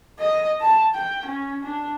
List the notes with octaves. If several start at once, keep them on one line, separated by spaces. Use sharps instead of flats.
D#5
A5
G5
C#4
D4